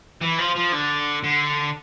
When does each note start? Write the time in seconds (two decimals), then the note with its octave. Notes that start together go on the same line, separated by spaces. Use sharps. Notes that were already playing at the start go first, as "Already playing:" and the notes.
0.22 E3
0.39 F3
0.56 F3
0.72 D3
1.24 D3